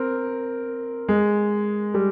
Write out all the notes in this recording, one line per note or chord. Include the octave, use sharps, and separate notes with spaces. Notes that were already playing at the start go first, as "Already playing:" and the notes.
Already playing: C4 A#4
G#3
G3